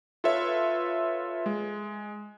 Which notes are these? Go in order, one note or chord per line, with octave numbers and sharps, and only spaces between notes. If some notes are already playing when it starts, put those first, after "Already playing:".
F4 A4 B4 C#5 E5
G#3